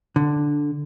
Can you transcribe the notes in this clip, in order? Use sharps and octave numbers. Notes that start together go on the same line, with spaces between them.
D3